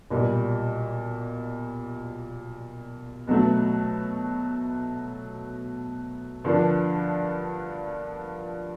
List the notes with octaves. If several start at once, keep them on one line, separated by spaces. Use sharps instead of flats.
B1 A#2 G3
B2 F#3 A3
G2 D3 F3 A#3 D4